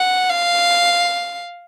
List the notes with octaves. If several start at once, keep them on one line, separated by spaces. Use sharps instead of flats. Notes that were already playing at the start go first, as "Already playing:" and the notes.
Already playing: F#5
F5